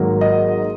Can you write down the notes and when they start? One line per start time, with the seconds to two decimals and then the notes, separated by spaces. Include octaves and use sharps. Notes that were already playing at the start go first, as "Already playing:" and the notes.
Already playing: G#1 G#2 F#3 A#3
0.21 D#5